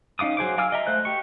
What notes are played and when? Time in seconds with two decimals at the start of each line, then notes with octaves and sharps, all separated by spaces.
0.19 C#4 D#4 F5 D6 D#6
0.37 F#3 G#4 C5 D6
0.58 F5 G#5 D6 E6 F6
0.72 D#5 E5 A#5
0.87 A3 C5 F#6
1.05 G4 C#6